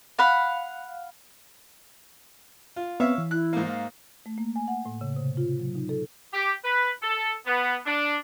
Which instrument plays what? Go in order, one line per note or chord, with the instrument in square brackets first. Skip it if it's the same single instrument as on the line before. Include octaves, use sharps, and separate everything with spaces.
[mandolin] F5 F#5 B5
[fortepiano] F4
[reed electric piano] B3 C4 [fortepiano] C#5 E5 F5
[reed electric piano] E3
[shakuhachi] E4 [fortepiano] F#6
[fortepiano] G#2 A#3
[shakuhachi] F5
[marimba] A3
A#3
G#5
F#5
A2
C#3
C3
F4
F#3
D#4
A4
[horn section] G4
B4
A4
B3
D4